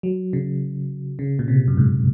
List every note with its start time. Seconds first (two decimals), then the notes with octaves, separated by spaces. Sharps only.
0.03 F#3
0.33 C#3
1.19 C#3
1.39 A#2
1.48 C3
1.68 F#2
1.77 G#2